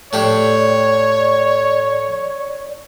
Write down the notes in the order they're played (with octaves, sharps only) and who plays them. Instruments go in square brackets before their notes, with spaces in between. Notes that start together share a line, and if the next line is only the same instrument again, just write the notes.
[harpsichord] A2 D4 G4 [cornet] C#5 [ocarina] D5